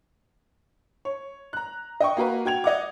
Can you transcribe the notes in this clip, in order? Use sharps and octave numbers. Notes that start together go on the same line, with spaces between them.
C#5
A#5 F#6
D#5 G5 C#6
A#3 F#4 A#4 B4
F#4 G5 G#6 F7
D5 D#5 F#5 D6